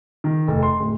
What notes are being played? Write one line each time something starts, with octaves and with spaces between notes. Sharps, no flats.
D#3
F1
C6
D1